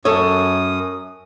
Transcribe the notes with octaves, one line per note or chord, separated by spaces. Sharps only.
F#2 A4 C#5 D#6